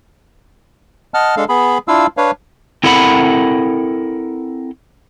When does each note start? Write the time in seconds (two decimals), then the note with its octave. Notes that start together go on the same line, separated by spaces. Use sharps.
1.14 D#5 F#5 A5 F6
1.37 G#3 D4 A4 F5
1.49 B3 G#4 B5
1.88 D4 E4 F4 F5 E6
2.17 D4 B4 C#5 F5
2.83 C4 E4 A4 A#4 F#5 B5